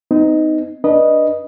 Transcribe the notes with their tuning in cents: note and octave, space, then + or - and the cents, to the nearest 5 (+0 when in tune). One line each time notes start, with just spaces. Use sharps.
C4 -45 D#4 +0
D4 +0 B4 -25 D#5 +0